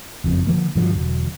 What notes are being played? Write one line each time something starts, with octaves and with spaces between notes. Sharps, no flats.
F#1 F2
D3 F3 A#3
G2 D3 F3 F#3
E1 C2 D3 F#3